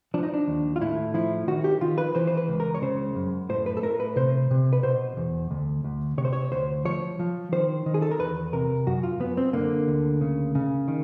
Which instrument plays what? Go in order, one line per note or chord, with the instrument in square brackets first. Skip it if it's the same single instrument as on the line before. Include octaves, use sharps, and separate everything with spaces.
[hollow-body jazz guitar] F3 D4
D#4
D4
D#2
F4
A2 E4
F3 E4
D#3 F#4
G4
D#3 F4
B4
E3 C5
C5
B4
C#2
A#4
C#5
C#3 C5
F#2
A2 C5
B4
A4
A2 A#4
B4
C3 C5
C3
B4
B2 C5
E2
D2
D2
C3 C#5
C5
C#5
D2 C5
F3 C#5
F3
D#3 C5
D#3
G#4
A4
A#4
E2 B4
C3 A#4
F#2 F#4
F4
F#2 B3
C4
D3 A#3
D2
C#3
C#3
D#3